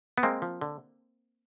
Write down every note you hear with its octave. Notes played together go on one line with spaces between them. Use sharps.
B3
G#3 A#3 C4
F3
D3